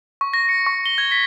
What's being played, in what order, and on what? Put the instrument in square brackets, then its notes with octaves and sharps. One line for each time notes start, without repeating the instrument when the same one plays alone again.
[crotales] C#6
A#6
C#7
C#6
G7
G#6
B6